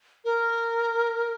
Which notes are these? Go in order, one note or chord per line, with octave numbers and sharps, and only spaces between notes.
A#4